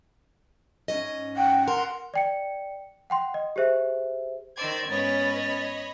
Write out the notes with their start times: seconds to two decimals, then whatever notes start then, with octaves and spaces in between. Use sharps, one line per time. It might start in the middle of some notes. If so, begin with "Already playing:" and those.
0.88 G#2 C#4 D#5
1.37 F#5 G5
1.68 A#4 C6
2.14 D5 G5 C#7
3.10 F#5 G5 C6
3.34 D#5
3.56 G4 G#4 C5 E5
4.56 D#3 C5 D5 E6 G#6
4.89 G#2 B3 C#4 B4 C#5 D#5 B5 A6